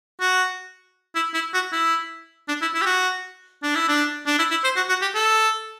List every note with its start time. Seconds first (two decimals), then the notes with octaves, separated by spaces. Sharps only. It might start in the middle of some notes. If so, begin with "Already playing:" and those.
0.20 F#4
1.15 E4
1.34 E4
1.54 F#4
1.72 E4
2.48 D4
2.62 E4
2.74 E4
2.82 G4
2.86 F#4
3.63 D4
3.75 E4
3.88 D4
4.26 D4
4.39 E4
4.51 E4
4.64 C5
4.76 F#4
4.89 F#4
5.02 G4
5.15 A4